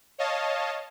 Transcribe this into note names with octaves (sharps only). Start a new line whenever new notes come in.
C#5 D#5 F5 A5